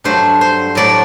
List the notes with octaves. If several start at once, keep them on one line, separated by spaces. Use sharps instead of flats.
G2 F#3 A3 D4 C5
C5
A2 F#3 A3 D5